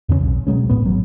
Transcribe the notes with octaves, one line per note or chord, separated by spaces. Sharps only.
E2 C#3 A3 C#4
B1
B2 F#3 G#3 C#4
E1 F#2 A2 B3
G#1 F#3